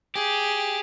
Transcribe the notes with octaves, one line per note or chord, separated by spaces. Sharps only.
G4 G#4